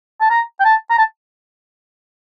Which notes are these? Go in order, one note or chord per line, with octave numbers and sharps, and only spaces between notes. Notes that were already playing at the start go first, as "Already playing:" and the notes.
A5
A#5
G5
A5
A#5
A5